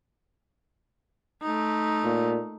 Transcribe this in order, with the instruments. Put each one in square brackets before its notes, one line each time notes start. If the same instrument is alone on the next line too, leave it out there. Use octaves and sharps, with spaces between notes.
[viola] A3 D#4
[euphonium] A#2